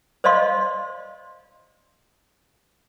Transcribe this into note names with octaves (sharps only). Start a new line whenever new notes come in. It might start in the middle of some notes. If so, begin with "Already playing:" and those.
C5 D5 D#5 F5 C6